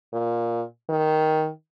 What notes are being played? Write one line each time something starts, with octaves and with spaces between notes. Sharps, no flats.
A#2
D#3